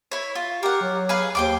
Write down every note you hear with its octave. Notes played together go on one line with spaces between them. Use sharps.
E4 C#5
F4
G4 A#4 F#5
F#3
G#4 B4 F5
D#2 C5 G5 D6